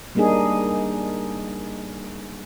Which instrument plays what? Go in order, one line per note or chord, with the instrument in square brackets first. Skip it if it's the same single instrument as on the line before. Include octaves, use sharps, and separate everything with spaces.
[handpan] G3 A#3 D4 D#4 G#4